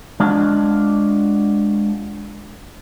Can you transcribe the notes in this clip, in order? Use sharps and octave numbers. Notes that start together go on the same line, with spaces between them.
G#3 D4 F4 F#4